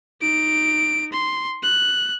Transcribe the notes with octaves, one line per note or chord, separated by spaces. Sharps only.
D#4 D7
C6
F#6